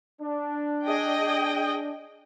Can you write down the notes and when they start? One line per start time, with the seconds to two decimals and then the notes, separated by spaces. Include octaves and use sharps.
0.20 D4
0.86 G#4 D#5 G5